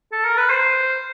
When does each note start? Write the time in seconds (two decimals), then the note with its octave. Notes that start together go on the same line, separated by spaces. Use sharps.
0.12 A4
0.24 A#4
0.38 B4
0.50 C5